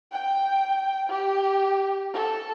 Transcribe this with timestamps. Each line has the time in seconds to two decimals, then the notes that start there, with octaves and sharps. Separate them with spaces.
0.12 G5
1.09 G4
2.13 A4